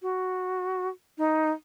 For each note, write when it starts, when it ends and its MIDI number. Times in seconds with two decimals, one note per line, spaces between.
0.02 0.88 66
1.18 1.51 63